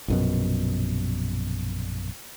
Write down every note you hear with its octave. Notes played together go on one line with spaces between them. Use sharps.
A#1 F#2 B2